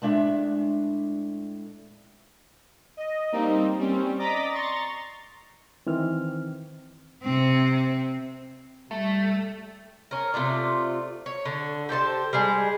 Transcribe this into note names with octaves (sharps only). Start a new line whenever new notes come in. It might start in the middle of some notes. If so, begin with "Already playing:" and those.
A2 G#3 D4 E5
D#5
G3 A#3 C4 D#4
G3 C4 C#4
D5 D#5 A#5 D6 A6 B6
A#5 C6 C#6 A6
D#3 E3 C4 F6
C3 C4
G3 A3
C#4 A#4
C3 A3 F4 D5
C#5
D3
G4 A4 C5 A5
G3 G#3 G#4